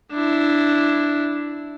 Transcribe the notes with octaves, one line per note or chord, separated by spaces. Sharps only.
D4 E4